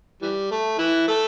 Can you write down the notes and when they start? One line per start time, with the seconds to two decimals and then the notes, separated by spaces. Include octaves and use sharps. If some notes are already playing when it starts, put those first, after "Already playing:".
0.22 E3 G3
0.51 A3
0.78 E3 E4
1.08 A3 A4